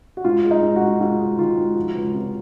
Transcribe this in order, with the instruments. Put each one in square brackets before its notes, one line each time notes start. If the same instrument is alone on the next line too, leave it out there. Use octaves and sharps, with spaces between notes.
[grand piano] F#4
[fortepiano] G#2 [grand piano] F4
[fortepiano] G#3
[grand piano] D#4
[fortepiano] G#2
[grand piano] F#4
[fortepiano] G#2
[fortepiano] G#2 [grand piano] F4
[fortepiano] G#3
[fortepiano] D#3 [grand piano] F4
[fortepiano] G#2
F3
C#2
C3